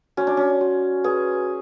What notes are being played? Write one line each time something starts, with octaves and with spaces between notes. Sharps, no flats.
C#4 F#4
D4
C#4
F#4
G#4 B4